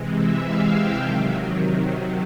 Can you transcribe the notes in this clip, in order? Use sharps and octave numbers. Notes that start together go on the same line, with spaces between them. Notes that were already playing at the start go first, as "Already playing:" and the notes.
Already playing: C3 E3 G#3
E5
F5
G5
C3 D#3 F#3 A5